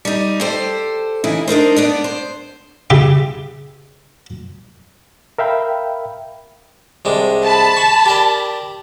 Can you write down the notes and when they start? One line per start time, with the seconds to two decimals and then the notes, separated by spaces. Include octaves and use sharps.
0.05 G3 D#4
0.41 G4 A4 C5
1.24 C#3 E3 D#4 E4
1.48 D4 D#4 A#4 C5
1.76 B3 D4 D5
2.04 C5
2.90 C#3 G4 E5 D6
5.39 A#4 E5 F5 G5 B5
7.05 C2 G#3 D4
7.43 A5 B5
7.77 C#6
8.06 G4 A#4 D5